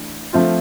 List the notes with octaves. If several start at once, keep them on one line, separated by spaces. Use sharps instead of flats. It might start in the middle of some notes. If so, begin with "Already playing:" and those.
Already playing: E3 A3 D4
F3 A3 C4 F4